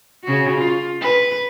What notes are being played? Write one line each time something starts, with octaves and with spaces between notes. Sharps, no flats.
C#3 F#4
F4
B4